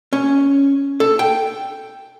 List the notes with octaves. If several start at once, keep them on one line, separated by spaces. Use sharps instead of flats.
C#4
A4
G5